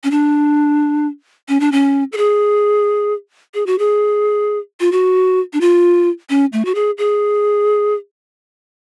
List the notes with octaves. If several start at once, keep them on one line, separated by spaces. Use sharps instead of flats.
C#4
D4
C#4
D4
C#4
A4
G#4
G#4
F#4
G#4
F4
F#4
D4
F4
C#4
A3
F#4
G#4
G#4